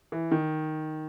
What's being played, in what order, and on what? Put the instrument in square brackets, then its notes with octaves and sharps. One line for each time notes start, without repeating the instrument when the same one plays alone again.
[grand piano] E3
D#3